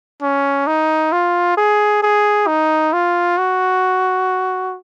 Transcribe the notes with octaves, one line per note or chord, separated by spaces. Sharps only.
C#4
D#4
F4
G#4
G#4
D#4
F4
F#4